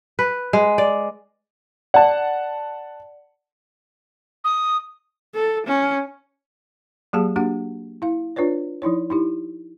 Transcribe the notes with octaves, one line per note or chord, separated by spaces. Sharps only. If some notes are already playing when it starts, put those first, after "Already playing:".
B4
G#3
D5
D5 F#5 A5
D#6
A4
C#4
F#3 A#3 G4 G#4 F5 A5
A#3 D4 F#4 G4 F#5
E4 F5
D4 F4 B4 C#5 D5
F3 D#4 E4 C#5
D#4 E4 G4